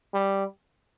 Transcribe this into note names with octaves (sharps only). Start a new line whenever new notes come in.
G3